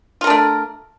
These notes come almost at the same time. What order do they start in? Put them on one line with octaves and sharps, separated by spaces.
F4 A#4 D4 A3